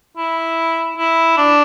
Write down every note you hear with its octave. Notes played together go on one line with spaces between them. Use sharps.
E4
E4
D4